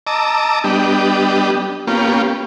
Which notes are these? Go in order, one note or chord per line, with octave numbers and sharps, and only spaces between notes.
D#5 A5 A#5 D6 E6
G3 B3 D4 G4 D#5
A#3 B3 C#4 F4 G4